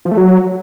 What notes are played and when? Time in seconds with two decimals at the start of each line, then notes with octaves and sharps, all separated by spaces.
0.05 F3
0.11 A3
0.17 F#3